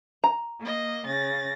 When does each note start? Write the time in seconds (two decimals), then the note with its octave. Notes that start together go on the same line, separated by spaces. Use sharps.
0.24 A#5
0.61 A#3 D#5
1.06 C#3 A6 A#6